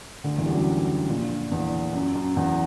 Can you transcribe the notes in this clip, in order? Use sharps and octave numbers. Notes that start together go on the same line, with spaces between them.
D2 D3
E2 E3
G3
F#2 F#3
A#1 A#2
E2
F#2
F#2
E2